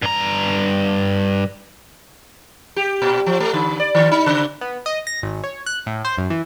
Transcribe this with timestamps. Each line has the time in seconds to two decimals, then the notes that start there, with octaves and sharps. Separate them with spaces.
0.02 G2 A#5
2.76 G4
3.02 A#2
3.26 F3
3.40 A3
3.54 D3
3.80 D5
3.95 D#3
4.11 D#4
4.26 C#3
4.61 B3
4.86 D#5
5.07 A#6
5.22 G#1
5.44 C#5
5.66 F#6
5.86 A2
6.05 C5
6.18 F#2
6.30 E3